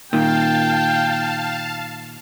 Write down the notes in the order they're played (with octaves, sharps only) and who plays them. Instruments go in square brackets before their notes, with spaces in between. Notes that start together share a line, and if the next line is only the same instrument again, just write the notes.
[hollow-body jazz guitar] A#2 D#3 [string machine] F5 A5 [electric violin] G5